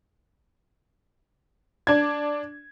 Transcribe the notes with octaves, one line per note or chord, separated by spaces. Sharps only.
D4 G#6